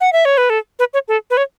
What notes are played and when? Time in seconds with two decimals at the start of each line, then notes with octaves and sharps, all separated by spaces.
0.01 F#5
0.13 E5
0.25 C#5
0.37 B4
0.50 A4
0.79 B4
0.93 C#5
1.08 A4
1.30 B4
1.37 C#5